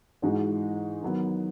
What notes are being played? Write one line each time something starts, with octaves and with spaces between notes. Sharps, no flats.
G#2 E3 G#3 D#4 F#4
D#3 F#3 B3